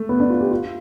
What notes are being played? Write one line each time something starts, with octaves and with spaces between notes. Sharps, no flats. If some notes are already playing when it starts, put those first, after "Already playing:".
Already playing: A3
B3
D4
F4
G4
F4